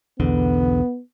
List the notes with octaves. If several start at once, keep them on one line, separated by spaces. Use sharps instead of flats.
B1 E2 D3 B3